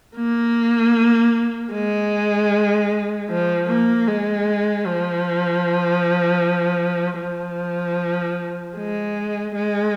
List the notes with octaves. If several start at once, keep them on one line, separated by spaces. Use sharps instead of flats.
A#3
G#3
F3
A#3
G#3
F3
F3
G#3
G#3